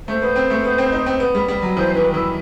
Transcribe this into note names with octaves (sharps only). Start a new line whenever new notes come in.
A3 C5
B3
C4
A3
B3
C4
D#4
C4
B3
G3
G3
F#3
E3 C5
D#3 B4
E3 E4